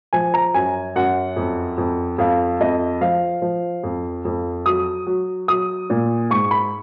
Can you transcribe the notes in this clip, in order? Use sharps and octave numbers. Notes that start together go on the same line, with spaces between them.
F3 G#5
A#5
F#2 G#5
F#2 F#5
F2
F2
F2 F5
F2 D#5
F3 F5
F3
F2
F2
F#3 D#6
F#3
F#3 D#6
A#2
G#2 C#6
B5